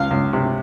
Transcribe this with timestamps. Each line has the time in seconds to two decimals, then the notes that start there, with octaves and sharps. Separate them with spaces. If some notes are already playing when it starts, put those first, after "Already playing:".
Already playing: C#2 F5
0.11 C#2
0.33 C3